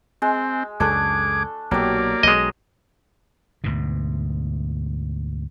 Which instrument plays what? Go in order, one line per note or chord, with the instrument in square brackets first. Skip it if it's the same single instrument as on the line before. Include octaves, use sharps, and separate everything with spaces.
[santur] G#3 [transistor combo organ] C4
[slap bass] C#2 F#2 C#3 [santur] A3 D4 A4 [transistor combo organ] G#4 D6
[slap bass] B1 A#2 [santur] F#3 G4 [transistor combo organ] A#3 D5
[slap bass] B1 [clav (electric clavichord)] G#3 D#5
[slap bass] D2 G#2 B2